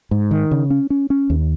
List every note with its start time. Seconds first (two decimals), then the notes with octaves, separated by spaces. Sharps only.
0.11 G#2
0.31 D#3
0.51 C#3
0.70 C#4
0.90 C#4
1.10 C#4
1.30 D#2